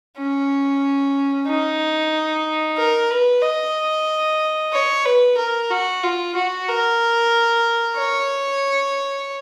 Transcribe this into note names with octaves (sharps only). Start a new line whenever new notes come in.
C#4
D#4
A#4
B4
D#5
C#5
B4
A#4
F#4
F4
F#4
A#4
C#5